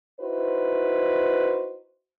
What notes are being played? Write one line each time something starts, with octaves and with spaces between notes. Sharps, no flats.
D#4 E4 F#4 B4 C5